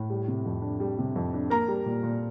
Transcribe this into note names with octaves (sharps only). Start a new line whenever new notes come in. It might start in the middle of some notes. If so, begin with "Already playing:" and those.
Already playing: A2
G3
C3
F2
D4
G3
C3
F2
D4
A#3 A#4 A#5
G3
A#2
A#2